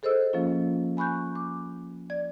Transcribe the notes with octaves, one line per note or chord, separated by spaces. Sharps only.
G#4 A4 C5 D#5 E6
F3 A#3 C#4 F4
G#5 B5 C#6 F#6 G6
D6
D5 G#6